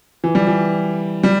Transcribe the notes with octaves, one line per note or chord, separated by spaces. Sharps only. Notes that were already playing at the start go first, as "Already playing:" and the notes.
E3
G3
E3
G3